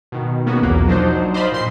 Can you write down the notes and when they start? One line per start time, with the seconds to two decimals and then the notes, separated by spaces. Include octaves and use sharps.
0.12 B2 D#3
0.46 A#3 B3 C#4 F#4 G#4
0.62 B1 E2 A#2 A#3
0.87 F3 F#3 D4 D#4 C5
1.34 C5 D5 D#5 F5 B5 C6
1.52 A#2 C6 C7